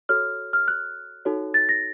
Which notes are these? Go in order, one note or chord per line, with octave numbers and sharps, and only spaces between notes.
F#4 A4 C#5 F6
F6
F#6
D#4 F#4 A4 C#5
A6
A#6